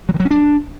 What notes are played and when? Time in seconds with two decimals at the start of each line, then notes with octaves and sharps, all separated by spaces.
0.09 F#3
0.14 D#3
0.20 F#3
0.25 C#4
0.31 D4